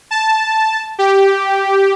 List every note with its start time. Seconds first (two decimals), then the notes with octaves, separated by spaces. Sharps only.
0.11 A5
0.99 G4